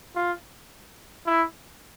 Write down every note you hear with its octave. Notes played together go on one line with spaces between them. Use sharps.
F4
E4